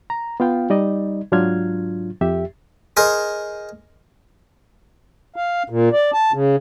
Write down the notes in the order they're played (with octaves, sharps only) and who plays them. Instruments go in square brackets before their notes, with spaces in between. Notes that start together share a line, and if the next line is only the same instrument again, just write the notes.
[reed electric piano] A#5
B3 F4 F5 G5
G3 D#4 D5 D#5
G#2 F#3 D4 F4 F6 G#6
F2 G4 E5
[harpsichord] G#4 A#4 C5 D#5
[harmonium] F5
A#2
D5
A5
C#3